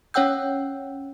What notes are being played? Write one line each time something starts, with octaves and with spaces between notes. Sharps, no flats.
C#4 C#5 F#5 G5 E6 G6